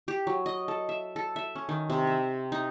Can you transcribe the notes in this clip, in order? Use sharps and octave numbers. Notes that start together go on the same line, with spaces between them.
G4
F#3
D#5
A4
E5
A4
E5
C#4
D#3
C3
E5
D#4